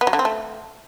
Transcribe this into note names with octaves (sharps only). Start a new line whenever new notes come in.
B3
F#3
D3
C4
A3